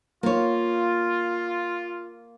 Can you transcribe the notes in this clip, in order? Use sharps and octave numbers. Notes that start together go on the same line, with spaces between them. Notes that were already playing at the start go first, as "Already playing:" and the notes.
A#3 F4 C#5